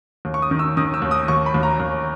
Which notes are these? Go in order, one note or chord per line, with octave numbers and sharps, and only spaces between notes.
D#2
C#6
D#6
D#3
E6
D#3 D#6
E6
D#2
D#6
D#2 C#6
B5
D#2
A#5
D#2